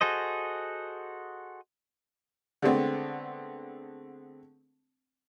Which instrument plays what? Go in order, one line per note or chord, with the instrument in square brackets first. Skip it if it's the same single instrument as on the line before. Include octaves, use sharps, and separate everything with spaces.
[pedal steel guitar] F#4 G#4 A4 C5 D#5
[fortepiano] D3 G#3 A3 B3 C4